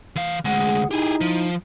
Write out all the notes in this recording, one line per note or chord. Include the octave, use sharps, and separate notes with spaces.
E3 F5
D2 G#3 G#4 F#5
D#4 E4 G4 G#4
F3